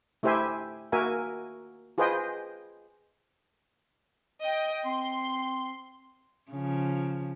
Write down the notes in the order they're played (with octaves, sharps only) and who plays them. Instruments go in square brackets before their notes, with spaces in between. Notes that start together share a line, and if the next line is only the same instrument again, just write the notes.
[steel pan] A3 E4 G4 C5 E5 G#5
A#3 F#4 A#4 E5 G#5
F4 G#4 B4 C5 D#5 G5
[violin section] D#5 G5
[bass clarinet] C4 [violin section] C6
[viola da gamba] C#3 F3